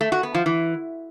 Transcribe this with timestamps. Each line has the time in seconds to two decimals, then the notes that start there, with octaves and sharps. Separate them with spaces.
0.01 A3
0.12 F#4
0.23 B3
0.35 F3
0.46 E3